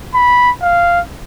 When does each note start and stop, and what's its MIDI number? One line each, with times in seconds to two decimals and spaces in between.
0.14 0.51 83
0.62 1.00 77